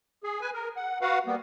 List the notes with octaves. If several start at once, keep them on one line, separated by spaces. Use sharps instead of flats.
G#4
B4 G#5
A#4
F#5
F#4 B4 F5 F#5
G3 A#3 B3